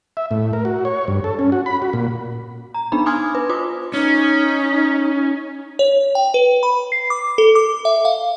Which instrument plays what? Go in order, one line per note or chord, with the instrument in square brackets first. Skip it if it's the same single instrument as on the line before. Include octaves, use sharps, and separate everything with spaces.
[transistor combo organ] E5
A2
A#4
F#4
C#5
G2
A4
C#4
F#4
B5
F#4
A#2
[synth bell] A#5
B3 D4 D#4 B5
G#5 C6 D6 D#6 F6 G#6
B4
F4 C5 D6 D#6
[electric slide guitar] C#4 [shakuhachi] D#4
[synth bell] C#5
G5
B4
B5
C7
D6
A4
D6
E5
F5